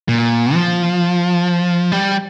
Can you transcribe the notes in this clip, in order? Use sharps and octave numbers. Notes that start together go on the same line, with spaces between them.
A#2
F3
G3